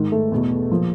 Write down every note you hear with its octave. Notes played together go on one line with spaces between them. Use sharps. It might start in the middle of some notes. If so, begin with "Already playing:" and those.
Already playing: G#2 D#3
A3 A4
E2 B2
A#2 F3